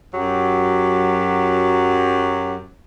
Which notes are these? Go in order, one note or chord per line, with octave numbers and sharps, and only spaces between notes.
F#2 F#3 G4